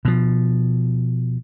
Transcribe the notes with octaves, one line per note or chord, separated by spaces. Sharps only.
B2 F3